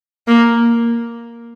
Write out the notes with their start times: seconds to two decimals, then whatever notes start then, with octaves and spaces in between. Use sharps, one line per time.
0.27 A#3